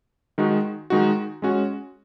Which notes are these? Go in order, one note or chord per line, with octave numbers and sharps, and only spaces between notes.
D#3 G#3 D#4 F#4
D#3 G#3 D#4 F#4
G#3 C#4 F#4